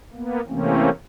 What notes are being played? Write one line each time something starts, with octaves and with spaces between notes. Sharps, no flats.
A#3 B3
C3 E3 A3 A#3 C4 C#4